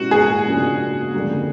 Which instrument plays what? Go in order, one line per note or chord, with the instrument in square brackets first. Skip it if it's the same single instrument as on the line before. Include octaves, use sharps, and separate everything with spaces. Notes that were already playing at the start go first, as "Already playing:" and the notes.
Already playing: [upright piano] B2 G#3 C#4 E4 G4 [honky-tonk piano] F#4
[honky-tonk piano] G#4
[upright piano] C#3 F3 A#3 D4 F#4
F2 D3 G3 A#3 D4